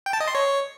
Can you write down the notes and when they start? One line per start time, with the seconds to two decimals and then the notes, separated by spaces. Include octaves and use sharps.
0.06 G5
0.13 A5
0.20 D#5
0.28 C6
0.35 C#5